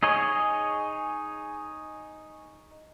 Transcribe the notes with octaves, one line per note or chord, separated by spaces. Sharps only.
D#4 G#4 C#5 D#5